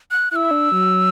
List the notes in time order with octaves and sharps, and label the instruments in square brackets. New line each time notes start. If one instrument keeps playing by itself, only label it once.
[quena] F#6
[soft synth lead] E4 [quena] E6 F#6
[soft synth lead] D4
F#3